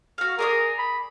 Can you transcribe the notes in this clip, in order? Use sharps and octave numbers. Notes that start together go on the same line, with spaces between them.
F#4 F5
G#4 A#4 D5 D#6
B5